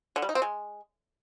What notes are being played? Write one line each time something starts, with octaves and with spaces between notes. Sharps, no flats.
D3
G3
D#4
C4
G#3